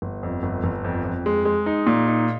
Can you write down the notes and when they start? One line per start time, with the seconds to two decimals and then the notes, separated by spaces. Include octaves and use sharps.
0.02 G1
0.23 F2
0.43 G1
0.64 G1
0.84 F2
1.04 F2
1.26 G#3
1.45 G#3
1.66 D#4
1.87 A#2
2.07 D#4